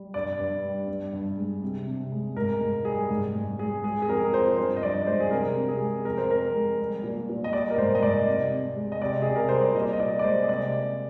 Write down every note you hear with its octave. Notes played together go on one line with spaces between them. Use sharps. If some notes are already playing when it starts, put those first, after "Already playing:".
Already playing: G3
G2 D5
G2
G3
G2
G2
G#3
C3
C3
G#3
G#2 A#4
G#2
G3 G#4
G#2
G#2
G#3 G#4
G#3 G#4
G#4
F2 A#4
F3 C5
G2 C5
D#5
G2 D5
G#3 C5
G#4
C3 A#4
C3
G#4
G#3
F2 A#4
C5
F2 A#4
G#3
G3
A#2
A#2
D#5
G3 D5
A#4
G#2 C5
D#5
G#2 D5
C3
C3
G#3
D#5
C3 D5
C3 G#4
A#4
G3 C5
D5
A#2 D#5
D#5
A#2 D5
D5
G#3 C5
D#5
C3 D5